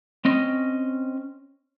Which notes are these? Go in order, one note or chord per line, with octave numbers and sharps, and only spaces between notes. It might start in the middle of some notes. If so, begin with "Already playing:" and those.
C4 C#4 D#5